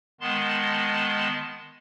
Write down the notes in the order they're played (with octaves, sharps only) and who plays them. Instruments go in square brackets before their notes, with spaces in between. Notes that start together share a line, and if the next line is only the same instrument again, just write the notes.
[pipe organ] D#3 G#3 B3 A5 C6